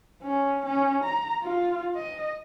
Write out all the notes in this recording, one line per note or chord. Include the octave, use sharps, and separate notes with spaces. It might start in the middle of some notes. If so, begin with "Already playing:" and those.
C#4
C#4
A#5
F4
D#5